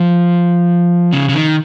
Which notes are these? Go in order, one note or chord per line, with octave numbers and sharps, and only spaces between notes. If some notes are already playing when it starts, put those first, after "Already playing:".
Already playing: F3
C#3
C#3
D#3